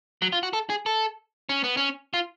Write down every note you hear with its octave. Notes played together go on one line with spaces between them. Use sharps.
F#3
F4
F#4
A4
G#4
A4
C#4
B3
C#4
F4